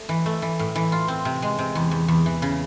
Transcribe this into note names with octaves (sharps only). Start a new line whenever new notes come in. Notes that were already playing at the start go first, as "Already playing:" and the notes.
Already playing: A3
E3
A3
E3
A2
E3
F4
C4
C3
G#3
C3
E2
E2
E2
E3
C#3